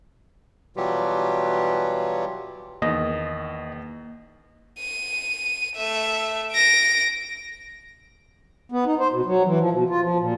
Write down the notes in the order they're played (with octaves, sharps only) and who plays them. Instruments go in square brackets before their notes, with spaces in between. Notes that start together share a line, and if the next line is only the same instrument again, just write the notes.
[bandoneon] B2 E3 F#3 G3 F4 G4
[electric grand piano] E2 D#3 [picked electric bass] A#3 [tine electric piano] D#5
[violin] D#7
A3 E5
A#6 D7
[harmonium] B3
D#4
C5
B2
F#3
E3
F3
B2
F4
F3
A#2